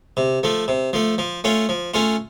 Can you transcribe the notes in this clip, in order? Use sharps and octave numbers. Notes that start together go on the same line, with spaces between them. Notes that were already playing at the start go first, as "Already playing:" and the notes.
C3
F3 A3
C3
F3 A3
F3
A3 C#4 F4
F3
A3 C#4 F4